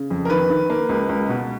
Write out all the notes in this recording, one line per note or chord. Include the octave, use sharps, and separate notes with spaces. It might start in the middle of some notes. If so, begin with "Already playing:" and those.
Already playing: C#3
F2
A#4
D#3 B4
D#3
A#3
C#2
C#2
B2